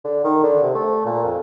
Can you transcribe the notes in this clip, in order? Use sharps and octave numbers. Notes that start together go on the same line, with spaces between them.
D3
D#3
D3
C3
A3
A#2
F2